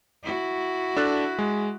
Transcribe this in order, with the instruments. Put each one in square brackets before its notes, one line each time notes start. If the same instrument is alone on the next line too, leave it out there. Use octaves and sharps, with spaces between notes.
[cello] E4 F#4
[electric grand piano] D4 A4 F#6
G#3